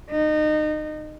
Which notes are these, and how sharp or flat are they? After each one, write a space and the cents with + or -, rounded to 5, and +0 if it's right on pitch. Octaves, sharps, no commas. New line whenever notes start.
D#4 -25